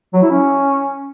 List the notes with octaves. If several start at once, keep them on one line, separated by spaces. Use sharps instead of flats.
F#3
E4
C#4